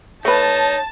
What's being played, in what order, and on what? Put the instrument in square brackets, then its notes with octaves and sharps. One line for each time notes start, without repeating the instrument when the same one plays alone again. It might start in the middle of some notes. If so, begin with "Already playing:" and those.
[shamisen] A3 B4 [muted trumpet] D#4 [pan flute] C#5 [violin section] A5